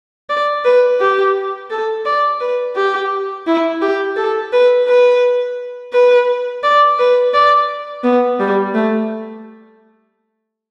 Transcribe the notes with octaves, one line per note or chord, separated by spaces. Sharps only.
D5
B4
G4
A4
D5
B4
G4
E4
G4
A4
B4
B4
B4
D5
B4
D5
B3
G3
A3